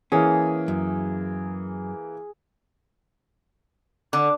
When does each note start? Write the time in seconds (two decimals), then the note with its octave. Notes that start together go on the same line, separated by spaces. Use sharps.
0.12 E3 A#3 C#4 G#4
0.68 F#2
4.13 D3 D6